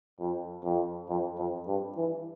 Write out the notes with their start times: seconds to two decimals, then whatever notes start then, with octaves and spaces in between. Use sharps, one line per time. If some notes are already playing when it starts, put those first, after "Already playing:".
0.20 F2
0.64 F2
1.09 F2
1.38 F2
1.67 G2
1.97 E3